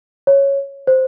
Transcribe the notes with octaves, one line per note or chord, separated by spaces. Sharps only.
C#5
C5